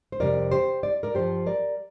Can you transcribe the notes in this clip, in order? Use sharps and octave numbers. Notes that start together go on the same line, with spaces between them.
C5
F2 C3 G3 A#4 D5
G4 C5
D5
A#4 D5
G2 F3 G4 C5
A#4 D5